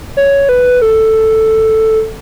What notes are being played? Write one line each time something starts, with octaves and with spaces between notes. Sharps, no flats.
C#5
B4
A4